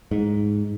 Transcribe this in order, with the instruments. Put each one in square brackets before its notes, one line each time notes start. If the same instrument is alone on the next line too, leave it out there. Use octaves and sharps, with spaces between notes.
[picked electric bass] G#2